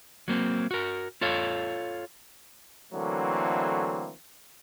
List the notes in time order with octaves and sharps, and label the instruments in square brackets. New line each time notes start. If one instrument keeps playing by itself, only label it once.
[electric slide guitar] F#3 A#3 C4
F#4 A#4
F4 A4 C#5 F5
[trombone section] D3 E3 F#3 A3 A#3 C4